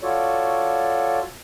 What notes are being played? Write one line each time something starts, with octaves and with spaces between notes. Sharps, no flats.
F4 F#4 A4 C#5 D5